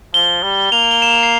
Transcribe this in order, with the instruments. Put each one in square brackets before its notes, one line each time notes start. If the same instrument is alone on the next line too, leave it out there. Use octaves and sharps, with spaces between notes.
[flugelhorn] F3 [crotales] G7
[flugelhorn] G3
[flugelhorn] A#3 [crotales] F7
[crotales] G7
E7
F7
C7